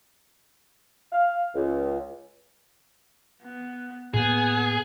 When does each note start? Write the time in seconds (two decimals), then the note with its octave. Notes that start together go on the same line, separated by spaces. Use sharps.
1.13 F5
1.55 C#2
3.43 B3
4.14 A2 A#3 B3 G#4 G#5